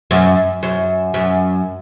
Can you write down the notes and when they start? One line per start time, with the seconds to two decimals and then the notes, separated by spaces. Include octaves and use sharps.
0.11 F#2
0.63 F#2
1.14 F#2